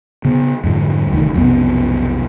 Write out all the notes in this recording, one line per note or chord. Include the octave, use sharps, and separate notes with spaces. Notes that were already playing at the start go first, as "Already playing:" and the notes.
C#3 B3
F2 G#2 D3 G3
F1 D2 D#3
B1 F2 C3 B3